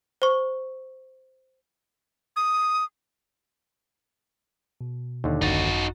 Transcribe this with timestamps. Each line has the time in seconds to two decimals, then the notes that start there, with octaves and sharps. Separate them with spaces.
0.22 C5 C#6
2.36 D#6
4.81 B2
5.24 D#2 D3
5.42 G#1 F#2 D#4 F#4 A6